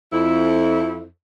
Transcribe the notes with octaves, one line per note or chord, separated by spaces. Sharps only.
F2 E4